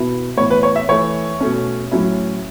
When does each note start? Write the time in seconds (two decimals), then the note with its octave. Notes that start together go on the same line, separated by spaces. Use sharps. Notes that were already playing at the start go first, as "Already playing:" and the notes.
Already playing: B2 B3 E4
0.37 A2 E3 B3 C#5
0.50 B4
0.63 C#5
0.76 E5
0.89 E3 A3 E4 C#5
1.40 B2 A3 C#4
1.92 A2 F#3 C#4 E4